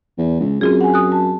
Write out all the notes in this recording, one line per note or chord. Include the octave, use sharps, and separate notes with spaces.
E2
C#2
F#2 C4 F4 G#4
F#5 G#5
D#6 F#6
A5